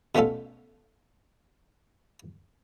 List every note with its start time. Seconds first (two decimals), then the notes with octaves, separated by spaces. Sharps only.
0.15 B2 A3 C#4 F4 A4